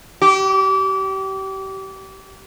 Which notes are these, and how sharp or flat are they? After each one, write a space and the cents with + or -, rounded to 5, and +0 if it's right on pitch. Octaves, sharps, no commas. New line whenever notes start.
G4 -30